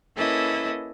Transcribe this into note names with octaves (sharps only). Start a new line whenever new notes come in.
A#3 C#4 E4 A4 B4 D#5